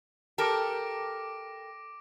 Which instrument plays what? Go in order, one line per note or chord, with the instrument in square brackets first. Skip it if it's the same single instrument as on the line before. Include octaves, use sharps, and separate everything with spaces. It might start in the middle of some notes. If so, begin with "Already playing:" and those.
[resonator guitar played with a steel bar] G4 A4 A#4 [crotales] D6 A#6 D7